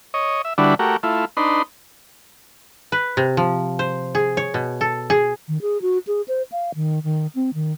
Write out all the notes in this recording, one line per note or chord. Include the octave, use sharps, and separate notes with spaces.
C#5 D#5
E5
D3 G3 D4 E4 F#4 B4
A3 F#4 G4 A#4
A3 E4 F4
D4 D#4 B4 C6
B4
C3
F3
C5
G#4
C#5
B2
A4
G#4
D#3
G#4
F#4
G#4
C5
F5
D#3
D#3
C4
D#3